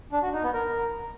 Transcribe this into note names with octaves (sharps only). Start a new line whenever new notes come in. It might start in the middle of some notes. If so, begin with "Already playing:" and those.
D4
F#4
D#4
B3
A#4